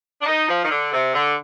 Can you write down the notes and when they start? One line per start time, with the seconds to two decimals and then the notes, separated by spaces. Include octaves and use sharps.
0.21 D4
0.26 D#4
0.49 F3
0.65 D#3
0.70 D3
0.92 C3
1.14 D3